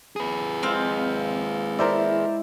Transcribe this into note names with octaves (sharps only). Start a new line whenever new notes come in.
G#4 B4
G#3 C4 F5
E4 A#4 C5 D5